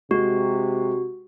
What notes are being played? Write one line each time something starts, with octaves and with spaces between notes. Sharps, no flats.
C3 G#3 F#4